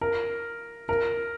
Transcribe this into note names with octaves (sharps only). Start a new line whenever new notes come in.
A#4
A#4